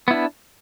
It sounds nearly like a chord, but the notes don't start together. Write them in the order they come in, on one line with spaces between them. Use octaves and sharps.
B3 E4 D4